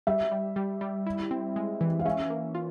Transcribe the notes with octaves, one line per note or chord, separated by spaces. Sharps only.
G3 E5
G3
G3
G3
E4
C4
G#3
E3
F5
C#4 E5
A#3
F4